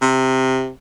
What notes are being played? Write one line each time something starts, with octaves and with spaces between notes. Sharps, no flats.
C3